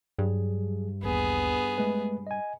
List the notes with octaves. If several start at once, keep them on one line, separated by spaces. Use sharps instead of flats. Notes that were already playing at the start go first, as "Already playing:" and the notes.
G2 F#3 G#4
A1 D#2 B3 G#4
G#3 A3 B4
D#5 G#5